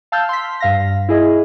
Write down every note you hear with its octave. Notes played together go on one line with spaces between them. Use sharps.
F5 A5 E6 F6 G6
C6 B6
G2 F5 A#6
E4 G#4 D#5